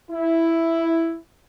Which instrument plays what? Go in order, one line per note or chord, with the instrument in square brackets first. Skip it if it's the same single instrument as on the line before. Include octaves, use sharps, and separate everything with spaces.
[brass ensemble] E4